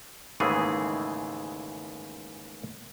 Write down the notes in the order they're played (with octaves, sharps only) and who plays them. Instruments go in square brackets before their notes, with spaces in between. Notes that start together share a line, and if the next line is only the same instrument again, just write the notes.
[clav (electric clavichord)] D#2 G#2 C#3 E3 A3 G#4